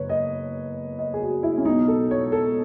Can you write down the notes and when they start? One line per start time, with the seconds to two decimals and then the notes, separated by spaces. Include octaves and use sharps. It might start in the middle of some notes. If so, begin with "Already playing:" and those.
Already playing: F#1 B4 C#5
0.09 D#5
0.99 D#5
1.14 G#4
1.21 F#4
1.43 E4
1.57 C#4
1.65 B1 B2 D#4
1.88 A4
2.11 C#5
2.32 A4